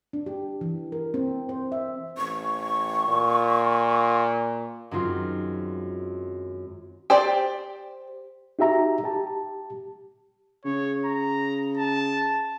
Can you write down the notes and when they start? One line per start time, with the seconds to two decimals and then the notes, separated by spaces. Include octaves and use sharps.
0.13 D4
0.26 G4
0.61 E3
0.92 A#4
1.14 C4
1.49 C5
1.72 E5
2.17 A1 C#6
3.07 A#2
4.91 F#2 D#3 G#3 C4 F4
7.10 G4 C5 D5
8.59 D#4 F#4 G4 E5 A#5
9.04 G4 A5
10.65 C#3 C#5
11.05 A#5
11.78 A5